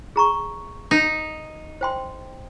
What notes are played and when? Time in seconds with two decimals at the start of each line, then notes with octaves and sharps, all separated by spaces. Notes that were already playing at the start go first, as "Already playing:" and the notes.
0.16 G#4 A#5 C#6
0.91 D#4
1.81 C5 G5 C6